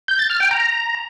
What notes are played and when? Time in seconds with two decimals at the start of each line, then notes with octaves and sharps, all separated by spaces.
0.08 G6
0.19 A6
0.30 F6
0.40 G5
0.51 A#5